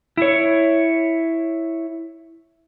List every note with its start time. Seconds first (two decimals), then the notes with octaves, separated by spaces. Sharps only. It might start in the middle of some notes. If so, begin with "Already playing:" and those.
0.17 E4 C#5